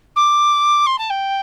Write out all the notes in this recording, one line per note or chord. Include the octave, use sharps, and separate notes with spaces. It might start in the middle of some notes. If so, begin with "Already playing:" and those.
D6
C6
A5
G5